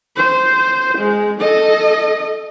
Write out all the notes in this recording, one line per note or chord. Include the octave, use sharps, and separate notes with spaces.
C5
G#3
A4 D#5